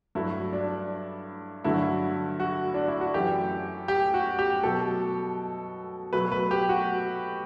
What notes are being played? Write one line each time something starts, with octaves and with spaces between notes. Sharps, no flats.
G2 F#3 A3 E4
D4
G2 D3 F#3 A3 E4
F#4
D4
E4
F#4
F#2 E3 A3 G4
G4
F#4
G4
B2 F#3 A3 A4
B2 F#3 A3 B4
B4
G4
F#4